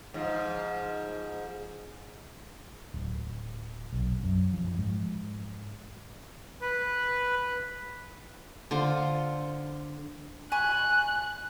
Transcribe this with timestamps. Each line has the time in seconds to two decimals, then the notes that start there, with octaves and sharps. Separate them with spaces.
0.14 G#2 F3
2.94 D1
3.93 B1
4.24 F#2
4.53 F3
4.78 G#2
6.61 B4
8.71 D3 F4 C5
10.52 G#5 B5 C#6 F#6